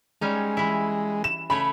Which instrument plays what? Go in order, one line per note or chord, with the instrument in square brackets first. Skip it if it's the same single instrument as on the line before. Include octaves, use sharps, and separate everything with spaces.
[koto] G3 C#4 D#4 [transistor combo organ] G#3
[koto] E3 E4
[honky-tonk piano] E7
[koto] C#3 A3 C#5 [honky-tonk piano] B5